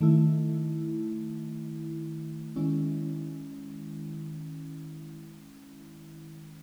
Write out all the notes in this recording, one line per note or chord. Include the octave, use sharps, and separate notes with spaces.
D#3 A3 E4
D#3 G#3 C#4 E4